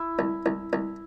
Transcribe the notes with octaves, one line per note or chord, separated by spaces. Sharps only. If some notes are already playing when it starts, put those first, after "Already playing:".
Already playing: E4
C2
C2
C2